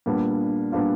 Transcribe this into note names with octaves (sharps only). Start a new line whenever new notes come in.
A#2 G3 B3 D4 F4
A#2 G3 B3 D4 F4